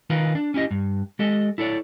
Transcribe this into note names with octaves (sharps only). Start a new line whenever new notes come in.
D#3 D#4 F4 A#4 B4
D4
C#4 E4 G4 D#5
G2
G#3 G4 A4 D#5
E4 A4 C#5 D5